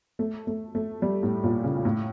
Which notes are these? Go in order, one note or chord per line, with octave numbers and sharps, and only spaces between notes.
A3
A3
A3
G3
A2
A#2
C#3
A2